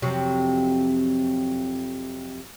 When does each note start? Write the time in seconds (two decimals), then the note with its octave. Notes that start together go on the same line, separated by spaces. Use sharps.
0.02 F2 C3 F#3